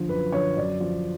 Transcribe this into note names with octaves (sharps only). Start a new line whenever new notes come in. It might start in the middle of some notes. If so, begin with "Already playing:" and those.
Already playing: D3 F3
F#2 B4
D3 F3 C#5
F#2 D5
F3